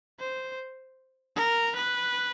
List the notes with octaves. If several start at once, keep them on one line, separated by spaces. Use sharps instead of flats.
C5
A#4
B4